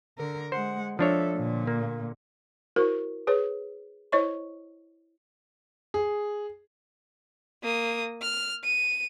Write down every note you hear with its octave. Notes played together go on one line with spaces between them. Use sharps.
D3 A#4
G#3 C5 F#5
F3 D4 A4 C#5 E5
A#2 D3
A#3
E4 F#4 A#4 C5
G#4 B4 C#5
E4 C5 C#5 D#5 C#6
G#4
A#3 D#6
F6
D#7